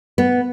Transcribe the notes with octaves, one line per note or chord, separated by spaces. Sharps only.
B3